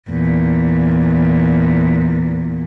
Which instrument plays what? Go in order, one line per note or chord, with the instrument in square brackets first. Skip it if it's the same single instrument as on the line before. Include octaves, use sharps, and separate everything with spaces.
[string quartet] E2 A#2